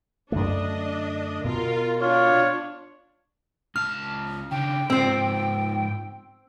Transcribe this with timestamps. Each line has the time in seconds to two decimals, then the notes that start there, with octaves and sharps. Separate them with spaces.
0.32 F#2 D3 A3 D4 D#5
1.45 B2 F4 A#4
2.01 D4 F4 C#5
3.76 C#2 A5 F6
4.51 C#3 D4 G5
4.90 G#2 F3 C4 C5 E6